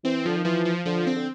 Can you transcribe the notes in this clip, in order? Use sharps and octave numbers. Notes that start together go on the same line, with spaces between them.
E3 C4
D3 F3
D#3
E3 F3
F3
D3 F3
C4
D3